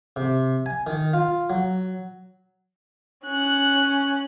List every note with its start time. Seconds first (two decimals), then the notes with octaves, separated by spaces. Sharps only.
0.16 C3
0.66 G#5
0.87 D#3
1.13 F4
1.50 F#3
3.24 C#4 F#6